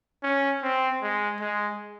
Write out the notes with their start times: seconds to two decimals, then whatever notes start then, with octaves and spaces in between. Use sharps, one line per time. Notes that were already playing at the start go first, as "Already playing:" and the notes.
0.23 C#4
0.63 C4
1.02 G#3
1.40 G#3